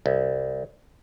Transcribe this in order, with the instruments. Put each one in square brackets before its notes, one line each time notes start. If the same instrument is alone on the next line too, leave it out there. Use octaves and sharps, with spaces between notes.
[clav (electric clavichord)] C2